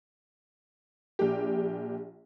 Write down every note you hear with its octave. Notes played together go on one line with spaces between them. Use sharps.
A#1 G4